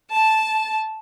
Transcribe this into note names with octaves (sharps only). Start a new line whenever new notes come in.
A5